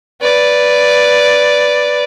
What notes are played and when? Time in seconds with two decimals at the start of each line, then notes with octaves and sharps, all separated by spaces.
0.21 B4 D5